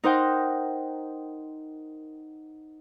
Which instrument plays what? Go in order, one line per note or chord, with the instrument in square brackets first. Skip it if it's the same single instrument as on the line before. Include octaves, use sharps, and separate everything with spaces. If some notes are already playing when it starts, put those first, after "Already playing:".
[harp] D#4 A#4 C5 F#5 G5